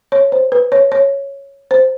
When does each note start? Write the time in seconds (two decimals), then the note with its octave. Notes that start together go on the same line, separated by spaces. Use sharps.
0.12 C#5
0.32 C5
0.52 B4
0.72 C#5
0.92 C#5
1.71 C5